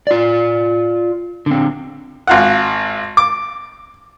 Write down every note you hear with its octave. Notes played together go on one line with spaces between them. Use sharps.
F4 D5
D3 C4
G#1 F4 F#5
D6